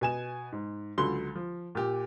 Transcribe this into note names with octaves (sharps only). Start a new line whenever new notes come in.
B2 G#5 E7
G#2
C#2 D3 F#3 C6 G7
F3
A#2 G4